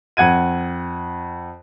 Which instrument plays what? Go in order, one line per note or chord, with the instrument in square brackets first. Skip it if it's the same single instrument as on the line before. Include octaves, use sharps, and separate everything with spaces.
[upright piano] F2 F#5 G#6 D#7